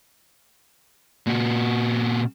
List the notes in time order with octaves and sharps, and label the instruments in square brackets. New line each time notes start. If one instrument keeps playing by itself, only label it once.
[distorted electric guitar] A#2 F#4